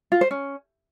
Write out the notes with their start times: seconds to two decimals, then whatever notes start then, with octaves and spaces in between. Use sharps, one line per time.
0.12 F4
0.21 C5
0.31 C#4